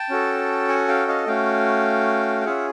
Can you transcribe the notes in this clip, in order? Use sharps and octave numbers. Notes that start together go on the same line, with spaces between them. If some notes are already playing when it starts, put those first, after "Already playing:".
Already playing: G5 A5
C#4 F#4 A4
F#5 G#5
F5 G5
D#5 F5
A3 C#4 F#4 F5 G5
G5
C#4 F4 G#4 E5 F#5